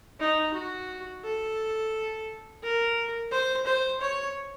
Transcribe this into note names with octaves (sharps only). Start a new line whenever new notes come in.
D#4
F#4
A4
A#4
C5
C5
C#5